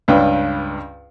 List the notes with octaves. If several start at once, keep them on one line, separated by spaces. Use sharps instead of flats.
C#2 G2 D4 B4 G5